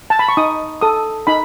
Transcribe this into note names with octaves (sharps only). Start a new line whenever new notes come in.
A5
B5
C#6
D#4 D#6
A4 D#6
D#4 B5